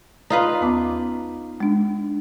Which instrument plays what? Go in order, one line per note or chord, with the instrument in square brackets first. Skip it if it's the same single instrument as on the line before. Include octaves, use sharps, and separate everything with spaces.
[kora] D#4 F4 B4
[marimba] D#2 B3 D6
G#3 D4